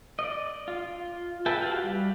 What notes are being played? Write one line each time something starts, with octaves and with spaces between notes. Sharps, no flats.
D5 D#5
F4
G#4 B4 E5 G5 A5
F#4 G4 F5 F#5
G3